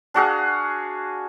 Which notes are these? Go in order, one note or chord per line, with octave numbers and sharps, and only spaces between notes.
D4 F#4 G#4 F5